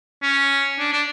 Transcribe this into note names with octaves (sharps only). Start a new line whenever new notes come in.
C#4
D4
D4